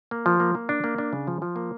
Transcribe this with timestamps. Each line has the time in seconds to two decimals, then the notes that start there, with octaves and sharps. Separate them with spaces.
0.11 A#3
0.26 F3
0.40 A#3
0.55 A#3
0.69 D4
0.84 A#3
0.98 D4
1.13 C#3
1.27 F3
1.42 F3
1.56 A#3